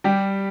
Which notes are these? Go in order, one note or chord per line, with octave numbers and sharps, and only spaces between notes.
G3 G4